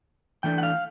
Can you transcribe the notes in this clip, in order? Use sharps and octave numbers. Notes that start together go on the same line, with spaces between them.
E3 A3 D4 G5
F#5
F5